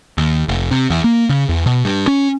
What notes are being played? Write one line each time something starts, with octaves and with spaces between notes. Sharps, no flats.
D#2
F1
C3
E2
A#3
C#3
E2
B2
G2
C#4